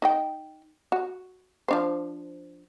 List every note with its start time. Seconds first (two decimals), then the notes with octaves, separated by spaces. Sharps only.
0.02 D#4 D#5 G5
0.92 F#4
1.68 F3 D4 C5